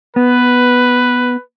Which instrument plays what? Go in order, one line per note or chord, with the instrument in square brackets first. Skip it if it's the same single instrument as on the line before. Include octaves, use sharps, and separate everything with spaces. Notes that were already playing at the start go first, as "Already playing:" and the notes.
[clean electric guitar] B3 [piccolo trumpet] B4